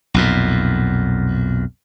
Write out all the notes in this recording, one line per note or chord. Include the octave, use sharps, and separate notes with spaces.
B1 F2 A#2